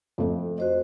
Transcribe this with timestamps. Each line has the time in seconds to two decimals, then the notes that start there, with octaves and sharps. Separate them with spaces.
0.18 F2 A3
0.58 F#4 C5 D#5